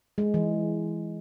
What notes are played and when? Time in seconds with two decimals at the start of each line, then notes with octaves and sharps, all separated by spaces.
0.18 G#3
0.34 E3